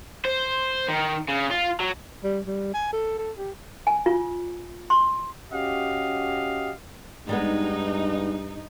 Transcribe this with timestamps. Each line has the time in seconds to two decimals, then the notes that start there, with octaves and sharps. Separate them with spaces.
0.25 C5
0.88 D#3
1.28 C#3
1.51 F4
1.80 F#3
2.24 G3
2.46 G3
2.74 G#5
2.92 A4
3.18 A4
3.38 G4
3.87 G#5
4.06 F4
4.90 C6
5.52 C#4 F#4 G4 D#5 F5
7.29 G2 G3 G#3 B3 D#4